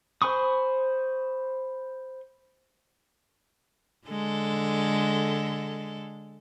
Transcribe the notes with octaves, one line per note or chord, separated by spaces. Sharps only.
C5 G#5 B5 C#6 D#6
D3 G#3 A4